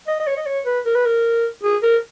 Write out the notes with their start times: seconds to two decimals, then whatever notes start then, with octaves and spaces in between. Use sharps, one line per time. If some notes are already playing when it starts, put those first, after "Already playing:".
0.07 D#5
0.20 D#5
0.27 C#5
0.37 D#5
0.46 C#5
0.66 B4
0.85 A#4
0.95 B4
1.05 A#4
1.63 G#4
1.83 A#4